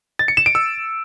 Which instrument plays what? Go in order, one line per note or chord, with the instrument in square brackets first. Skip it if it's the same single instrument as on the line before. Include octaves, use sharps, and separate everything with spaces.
[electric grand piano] A6
C#7
E7
D7
E6